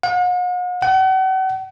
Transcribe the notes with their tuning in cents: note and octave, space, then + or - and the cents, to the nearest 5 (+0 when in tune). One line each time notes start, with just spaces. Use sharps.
F#5 -45
F#5 +40